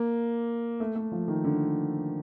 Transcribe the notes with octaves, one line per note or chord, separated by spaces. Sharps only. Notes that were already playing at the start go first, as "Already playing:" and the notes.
Already playing: A#3
A3
A3
F3
D#3
D3